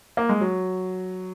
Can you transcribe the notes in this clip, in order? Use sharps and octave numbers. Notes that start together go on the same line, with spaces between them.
A#3
G#3
F#3